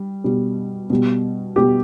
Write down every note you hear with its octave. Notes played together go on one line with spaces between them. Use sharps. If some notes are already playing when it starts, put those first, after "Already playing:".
Already playing: G3
B2 G3
B2 G3
B2 G3 G4